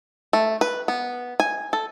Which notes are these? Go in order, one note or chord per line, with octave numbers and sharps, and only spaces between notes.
A3
B4
B3
G#5
A4